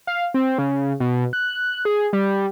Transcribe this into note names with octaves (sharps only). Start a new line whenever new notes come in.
F5
C4
C#3
B2
F#6
G#4
G3